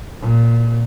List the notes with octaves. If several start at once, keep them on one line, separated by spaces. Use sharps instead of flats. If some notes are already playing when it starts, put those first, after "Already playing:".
A#2